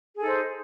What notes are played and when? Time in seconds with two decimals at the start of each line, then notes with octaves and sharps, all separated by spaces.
0.15 G#4
0.19 A4
0.22 D#4
0.26 C5